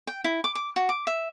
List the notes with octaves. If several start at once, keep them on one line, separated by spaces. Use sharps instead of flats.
G5
E4
D6
D6
F#4
D6
E5